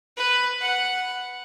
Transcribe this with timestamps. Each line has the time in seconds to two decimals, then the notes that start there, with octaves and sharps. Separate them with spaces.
0.17 B4
0.61 F#5